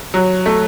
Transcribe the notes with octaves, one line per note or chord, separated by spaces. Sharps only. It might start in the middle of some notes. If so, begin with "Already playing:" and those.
F#3
A3